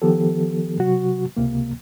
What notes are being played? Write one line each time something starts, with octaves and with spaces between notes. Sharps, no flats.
D#3 F3 B3 G4 A4
C3 F#3 F#4
C#2 C3 A#3